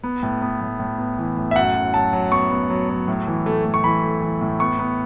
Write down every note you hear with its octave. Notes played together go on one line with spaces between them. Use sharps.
B3
A2
B3
A2
A2
B3
E3
A2
E5
F#2 F#5
F#2
F#3 A5
F#3
B3 C#6
B3
F#3
F#3
A2
E3
A3
A3
C#6
E3 B5
A3
E3
A2
B3 C#6
B3